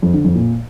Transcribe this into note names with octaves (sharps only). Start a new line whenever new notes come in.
F2
D3
F2
A#2